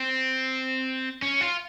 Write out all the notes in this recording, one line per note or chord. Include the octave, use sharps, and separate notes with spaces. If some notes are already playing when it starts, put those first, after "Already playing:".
Already playing: C4
C#4
F4